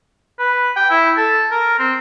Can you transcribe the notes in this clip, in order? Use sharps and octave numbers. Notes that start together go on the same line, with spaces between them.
B4
G5
E4
A4
A#4
C4